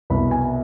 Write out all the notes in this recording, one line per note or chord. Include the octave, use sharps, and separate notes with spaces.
C2 B2 B5
G#5